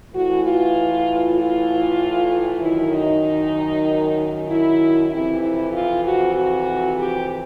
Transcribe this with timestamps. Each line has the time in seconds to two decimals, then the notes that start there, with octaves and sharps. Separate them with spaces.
0.13 A2 E3 F#4
0.43 F4
1.37 F4
2.61 F#2 D#3 E4
2.93 D#4
4.48 E4
5.10 F2 C3 E3 E4
5.41 E4
5.73 F4
6.04 F#4
6.35 F#4
6.98 G4